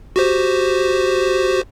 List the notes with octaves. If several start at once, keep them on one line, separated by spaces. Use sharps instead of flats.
F#4 G4 C5